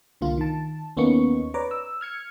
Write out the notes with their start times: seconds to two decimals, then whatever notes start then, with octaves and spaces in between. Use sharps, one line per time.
0.21 C2 D3 A#3 F4
0.38 D#3 A5
0.97 D#2 A#3 B3 C#4 D#4 C#6
1.54 B4 C#5 D5 A#5 D6
1.71 E6
2.01 F6 G#6 C#7